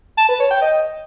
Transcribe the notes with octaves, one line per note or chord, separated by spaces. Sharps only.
A5
B4
C#5
G5
D#5